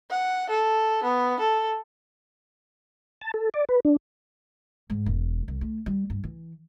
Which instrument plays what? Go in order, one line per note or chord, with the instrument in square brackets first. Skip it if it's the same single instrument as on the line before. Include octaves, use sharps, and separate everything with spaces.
[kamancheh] F#5
A4
B3
A4
[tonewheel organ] A5
A4
D5
B4
D4
[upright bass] G#2
E1
C2
A3
G3
G2
E3